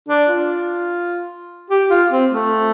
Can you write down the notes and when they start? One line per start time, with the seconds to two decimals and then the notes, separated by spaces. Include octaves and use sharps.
0.09 D4
0.28 F4
1.70 G4
1.90 F4
2.11 C4
2.31 A3